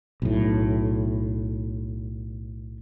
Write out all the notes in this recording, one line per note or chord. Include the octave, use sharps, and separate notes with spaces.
B1 A2